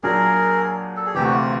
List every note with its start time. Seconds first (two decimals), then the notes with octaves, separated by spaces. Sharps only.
0.03 A#2 F#3 A#3 D4 G#4 A#4
0.97 A4
1.06 G#4
1.15 D2 C3 E3 G4
1.24 F#4
1.33 F4